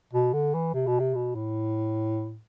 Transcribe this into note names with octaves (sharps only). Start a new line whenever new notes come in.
B2
D3
E3
C3
B2
C3
B2
A2